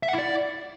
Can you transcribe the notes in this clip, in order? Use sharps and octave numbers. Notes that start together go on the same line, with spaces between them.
E5
F#5
E4
D5